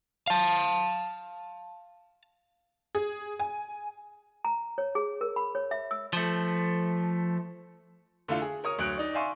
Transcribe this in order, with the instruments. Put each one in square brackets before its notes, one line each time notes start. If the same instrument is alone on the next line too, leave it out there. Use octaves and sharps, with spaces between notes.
[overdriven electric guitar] F5 A5
[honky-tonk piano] G#4
G#5
[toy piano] A#5
C#5
G#4
A#4
B5
C#5
E5
E6
[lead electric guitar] F3 A3
[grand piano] D3 A3 E4 F4
G#4
A#4 C#5 D#6
D2 F#3 C#5 F#6 D7
D#4 D5
D5 E5 F5 G#5 C6 C#6